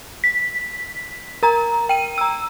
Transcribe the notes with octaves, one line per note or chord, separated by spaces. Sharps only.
B6
A#4 A#5
G5 D#7
A#5 E6